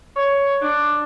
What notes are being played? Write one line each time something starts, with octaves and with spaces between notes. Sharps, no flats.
C#5
D4